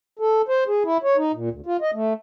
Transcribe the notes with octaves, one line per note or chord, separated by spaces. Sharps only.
A4
C5
G#4
E4
C#5
D#4
A#2
D2
F4
D#5
A3